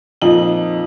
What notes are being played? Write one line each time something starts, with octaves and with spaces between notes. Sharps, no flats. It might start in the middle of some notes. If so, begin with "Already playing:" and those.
F2 A#2 D#4 F#7